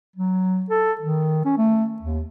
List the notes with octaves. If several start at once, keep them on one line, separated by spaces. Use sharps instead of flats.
F#3
A4
D#3
C#4
A3
D#2